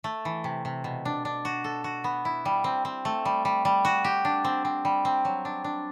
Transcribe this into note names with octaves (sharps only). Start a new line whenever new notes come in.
A3
E3
C3
C3
B2
D4
D4
F#4
A4
F#4
B3
E4
G3
C4
C4
A3
G3
G3
G3
F#4
G4
D4
C4
C4
G3
C4
F#3
D4
D4